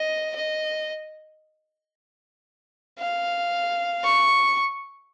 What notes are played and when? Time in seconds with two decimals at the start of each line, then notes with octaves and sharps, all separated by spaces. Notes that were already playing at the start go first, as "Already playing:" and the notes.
Already playing: D#5
0.35 D#5
2.99 F5
4.04 C#6